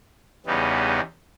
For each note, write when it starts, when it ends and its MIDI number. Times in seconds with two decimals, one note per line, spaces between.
0.46 1.00 40
0.46 1.00 49
0.46 1.00 55
0.46 1.00 59
0.46 1.00 63